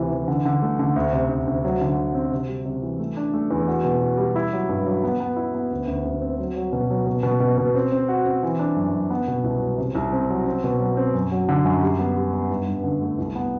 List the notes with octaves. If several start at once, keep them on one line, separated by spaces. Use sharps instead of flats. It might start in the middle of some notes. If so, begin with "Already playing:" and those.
Already playing: D2 C3 E3
E3
D3
D3
A3
D3
D2
C3
D2
D2
F#3
D3
F#3
C4
C3
G3
C3
E3
A3
D4
A3
E2
F#4
B2
F#4
G3
E4
F#3
G2
F#3
B3
B3
E4
B3
D2
D2
D2
C4
F#3
F#3
B2
F#3
B2
B2
B2
B2
C4
C4
F#4
C4
E3
D4
F#2
F#2
B3
B2
C2
F#3
C3
C2
C4
F#3
C4
B2
F#3
C4
F#2
F#3
D3
F#2
G3
B3
G3
B3
G2
G2
D3
A3
C2
B3